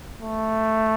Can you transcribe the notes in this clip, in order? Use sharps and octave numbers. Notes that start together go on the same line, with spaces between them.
A3